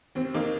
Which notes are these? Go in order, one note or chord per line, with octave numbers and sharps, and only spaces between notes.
D#2 C4
D#2 A#3 D#4